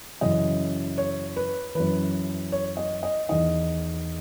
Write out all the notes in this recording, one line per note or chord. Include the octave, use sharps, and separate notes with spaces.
F#2 C#3 E3 D#5
C#5
B4
F#2 E3 B4
C#5
D#5
D#5
E2 D#3 D#5